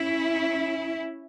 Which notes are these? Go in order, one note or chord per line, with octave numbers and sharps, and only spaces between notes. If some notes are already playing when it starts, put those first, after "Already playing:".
Already playing: C#4 E4